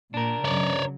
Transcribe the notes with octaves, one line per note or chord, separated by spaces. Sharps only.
A#2 D4 A#4
C#3 F#3 C#5 D5